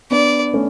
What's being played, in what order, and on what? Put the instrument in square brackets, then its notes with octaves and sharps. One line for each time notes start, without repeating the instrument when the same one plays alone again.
[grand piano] B3 D4 [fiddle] D5
[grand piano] A3 C#4